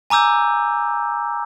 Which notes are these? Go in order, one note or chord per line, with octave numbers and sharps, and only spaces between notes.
G#5 A#5 D6 E6 G6